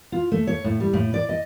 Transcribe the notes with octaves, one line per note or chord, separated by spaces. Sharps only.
F4
A3
C#5
A2
G3
A2
D5
D#5